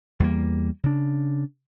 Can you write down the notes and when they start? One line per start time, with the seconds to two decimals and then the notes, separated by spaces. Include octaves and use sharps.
0.20 E2 G3 A#3
0.84 C#3 D4